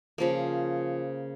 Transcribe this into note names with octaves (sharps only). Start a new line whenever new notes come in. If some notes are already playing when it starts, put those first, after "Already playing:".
C#3 F3 A#3